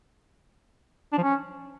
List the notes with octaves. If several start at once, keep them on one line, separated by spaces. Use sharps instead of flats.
D4
F3
C#4